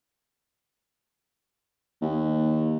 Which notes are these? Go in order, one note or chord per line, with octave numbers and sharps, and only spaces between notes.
D#2